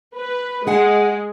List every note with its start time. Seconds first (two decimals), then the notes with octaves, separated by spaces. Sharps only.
0.15 B4
0.67 G#3 G#4 F#5 G#5